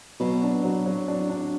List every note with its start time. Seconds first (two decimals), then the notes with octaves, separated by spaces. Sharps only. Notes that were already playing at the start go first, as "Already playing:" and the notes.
0.20 B2 F#3
0.42 D4
0.64 F#3
0.86 F#3
1.08 D4
1.30 D4